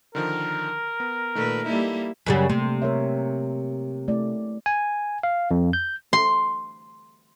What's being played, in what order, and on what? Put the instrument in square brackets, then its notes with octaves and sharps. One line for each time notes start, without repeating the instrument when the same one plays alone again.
[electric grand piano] D3 D#3 F3 [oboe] A#4
[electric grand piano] B3
[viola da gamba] A#2 B4 [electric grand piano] D#3 A3 A4
[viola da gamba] G3 A#3 E4 [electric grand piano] D#4 A4
[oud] F#2 C#3 G3
[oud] C3 [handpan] F#3 A3 A#3
[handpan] A#4 C#5 E5
A3 E4 D5
[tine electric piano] G#5
F5
F2
G6
[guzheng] C6